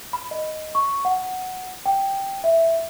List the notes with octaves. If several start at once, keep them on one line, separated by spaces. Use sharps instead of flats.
B5
D#5
C#6
F#5
G5
E5